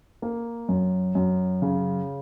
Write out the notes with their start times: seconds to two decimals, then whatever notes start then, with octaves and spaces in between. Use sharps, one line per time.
0.22 A#3
0.69 F#2
1.15 F#2
1.62 C#3